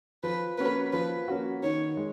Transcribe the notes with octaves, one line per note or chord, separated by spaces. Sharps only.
F3 B4
A#3 C#4 F#4 B4
F3 B4
A#3 C#4 F#4
D#3 C#5
G#3